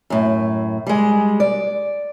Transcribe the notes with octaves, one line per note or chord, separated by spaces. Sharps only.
F#2 A2
G3 G#3
D5